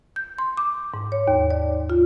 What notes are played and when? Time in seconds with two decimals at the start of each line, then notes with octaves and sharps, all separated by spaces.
0.16 G6
0.38 C6
0.57 D6
0.94 G#2
1.12 C#5
1.28 D#2
1.51 D5
1.90 F4